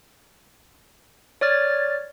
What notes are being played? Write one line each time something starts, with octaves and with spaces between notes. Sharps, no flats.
C#5 D5 F6 A6